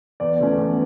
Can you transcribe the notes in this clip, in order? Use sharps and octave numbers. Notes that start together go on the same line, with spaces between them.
E2 D5
D3 F3 A3 C#4
E2